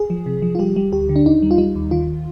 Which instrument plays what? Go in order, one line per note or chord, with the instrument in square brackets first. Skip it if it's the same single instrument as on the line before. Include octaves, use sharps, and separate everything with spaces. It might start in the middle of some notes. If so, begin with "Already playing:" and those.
Already playing: [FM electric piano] G#4
F3
C3
F3
F4
G3 G4
G3
D2 G4
D3
D4
D#2 D#4
G3
F4
G3 D#4
D#2
D#3 F4